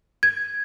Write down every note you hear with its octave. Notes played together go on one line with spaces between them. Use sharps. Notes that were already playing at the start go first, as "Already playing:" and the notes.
G#6